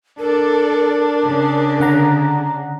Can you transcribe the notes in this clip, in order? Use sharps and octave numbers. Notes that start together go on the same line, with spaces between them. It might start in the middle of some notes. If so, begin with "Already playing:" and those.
D4 A4 A#4 D5
C#3
D3 F#5 A#5